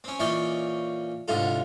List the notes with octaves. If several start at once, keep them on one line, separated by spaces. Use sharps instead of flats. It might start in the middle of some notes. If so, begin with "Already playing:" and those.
C4 C#4
A#2 E3 C#4 D5 D#5 G5
C2 G#2 D3 F4 A4